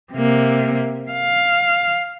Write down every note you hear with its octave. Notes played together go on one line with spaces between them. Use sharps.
C3 A#3
F5